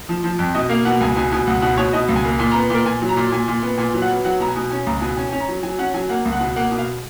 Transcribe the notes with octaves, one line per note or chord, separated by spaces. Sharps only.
F3
F3
F2
B2 D#5
A#3 F5
B2 F#5
C#2 G#5
B2 G#5
B2 G#5
C#2 F#5
B2 F#5
B2 C#5
B2 D#5
C#2
G#5
A#3
A#2 G#5
A#5
B3
A#2 A#4
A#2 G#5
F#3
A#5
A#2
A#2 G#5
A#2
B3
A#2 G#5
F#3
F#5
B3
F#3 F#5
B2 A#5
G#5
B2
C#4 G#5
C#2 A#5
B2 G#5
C#4 G#5
G#5
C#4
A#5
F#3
F#3 G#5
C#4 F#5
F#3 G#5
A#3 F#5
C#2
F#5
B2
A#3 F#5
B2
F5